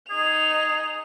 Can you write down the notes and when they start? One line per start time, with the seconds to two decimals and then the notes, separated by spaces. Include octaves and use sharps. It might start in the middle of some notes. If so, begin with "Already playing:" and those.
0.10 D#4 G#4 F7